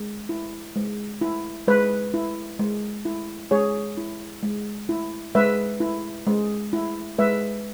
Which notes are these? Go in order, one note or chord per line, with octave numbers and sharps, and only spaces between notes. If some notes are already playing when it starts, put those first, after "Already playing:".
Already playing: G#3
E4
G#3
E4
G#3 B4
E4
G#3
E4
G#3 G#4 C#5
E4
G#3
E4
G#3 B4 E5
E4
G#3
E4
G#3 B4 E5